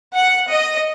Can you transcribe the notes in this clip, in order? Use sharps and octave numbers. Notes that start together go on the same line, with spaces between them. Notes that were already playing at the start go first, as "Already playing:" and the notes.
F#5
D#5